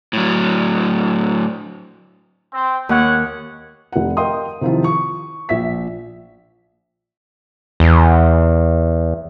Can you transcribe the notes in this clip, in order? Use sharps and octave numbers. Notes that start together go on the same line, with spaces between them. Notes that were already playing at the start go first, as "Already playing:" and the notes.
A2 F#3
C4
D#2 C#5 F#5
F1 F#5
A#4 D#5 F5 G5 C6 D#6
C3 D#3 F3 E4 F4
C#6
A#1 E5 B6
E2